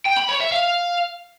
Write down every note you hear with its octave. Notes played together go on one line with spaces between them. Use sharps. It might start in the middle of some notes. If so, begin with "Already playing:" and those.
G5
B5
C#5
E5
F5